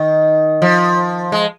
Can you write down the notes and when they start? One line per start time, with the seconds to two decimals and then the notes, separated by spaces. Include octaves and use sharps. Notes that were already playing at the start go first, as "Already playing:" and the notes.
Already playing: D#3
0.62 F3
1.32 G#3